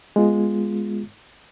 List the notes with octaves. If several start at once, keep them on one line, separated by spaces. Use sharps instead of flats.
G#3 B3 F4